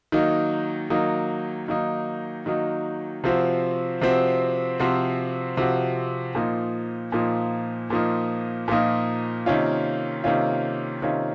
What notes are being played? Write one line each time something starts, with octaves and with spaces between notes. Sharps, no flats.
D#3 F#3 A#3 D#4
D#3 F#3 A#3 D#4
D#3 F#3 A#3 D#4
D#3 F#3 A#3 D#4
C3 F3 C4 F#4
C3 F3 C4 F#4
C3 F3 C4 F#4
C3 F3 C4 F#4
A#2 F3 A#3 D#4
A#2 F3 A#3 D#4
A#2 F3 A#3 D#4
A#2 F3 A#3 D#4
C3 D#3 A#3 C#4 F4
C3 D#3 A#3 C#4 F4
C3 D#3 A#3 C#4 F4